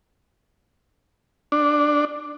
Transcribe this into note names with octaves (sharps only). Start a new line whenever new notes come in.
D4